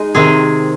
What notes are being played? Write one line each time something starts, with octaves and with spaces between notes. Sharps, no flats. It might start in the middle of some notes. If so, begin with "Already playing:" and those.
Already playing: G#3 D#4
C3 D#3 C4 G#4